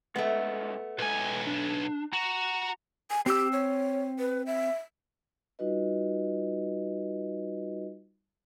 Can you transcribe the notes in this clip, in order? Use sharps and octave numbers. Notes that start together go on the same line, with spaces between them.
C2 G#3 A3 B3
B1 G#3 B4 G#5
D4
F#4 A#5
G#5
C4 G4 E6
C#5
B4
E5
G3 D#4 F4 F#4 B4 D#5